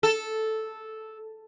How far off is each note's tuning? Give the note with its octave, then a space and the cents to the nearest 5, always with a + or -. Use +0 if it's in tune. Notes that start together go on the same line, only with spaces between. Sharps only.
A4 -5